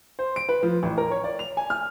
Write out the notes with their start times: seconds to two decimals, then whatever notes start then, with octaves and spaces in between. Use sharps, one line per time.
0.19 C5
0.36 D7
0.49 B4
0.63 F3
0.83 A1
0.98 A#4
1.11 C#5
1.24 D5
1.39 F7
1.57 G#5
1.70 F6